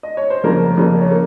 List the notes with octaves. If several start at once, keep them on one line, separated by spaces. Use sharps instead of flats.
D#5
C#5
C5
F2 C#3 G3 A#3 A#4
F2 C#3 G3 A#3
C#5
A#3